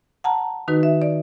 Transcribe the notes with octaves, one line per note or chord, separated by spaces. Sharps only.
F#5 A5 A#5
D#3 D#4 F#4 B4
E5
D5